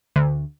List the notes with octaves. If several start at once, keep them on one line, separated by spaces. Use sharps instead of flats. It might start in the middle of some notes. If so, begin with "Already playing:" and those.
D2